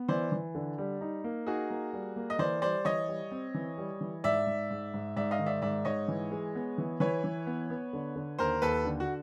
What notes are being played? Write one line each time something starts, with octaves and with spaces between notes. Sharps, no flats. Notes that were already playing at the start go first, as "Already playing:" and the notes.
Already playing: B3
E3 C5 D5
E3
D3
G3
D#4
A#3
D#4 F#4 G#4
A#3
G3
A#3
D#5
E3 C5 D5
G3 C5 D5
E3 C#5 D#5
G3
C4
E3
G3
E3
G#2 D5 E5
G#2
G#2
G#2
G#2 D5 E5
D#5 F5
D#3
D5 E5
G#2 D5 E5
G#2 C#5 D#5
E3
G#3
B3
E3
E3 B4 C#5
E3
B3
B3
D3
D3
D#2 A#4 C5
D#2 A4 B4
D3
F#4